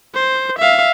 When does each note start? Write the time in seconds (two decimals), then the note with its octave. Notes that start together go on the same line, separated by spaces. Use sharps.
0.14 C5
0.59 E5 F5